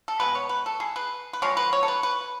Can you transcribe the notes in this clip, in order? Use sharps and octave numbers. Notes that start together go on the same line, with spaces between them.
A4
B2 G#3 B3 B4
C#5
B4
A4
G#4
B4
B4
D3 F3 G#3 C#5
B4
C#5
A4
B4
B4